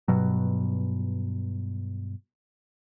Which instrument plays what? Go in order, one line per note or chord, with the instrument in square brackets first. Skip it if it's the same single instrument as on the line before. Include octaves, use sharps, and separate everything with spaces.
[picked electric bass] G2 B2 F#3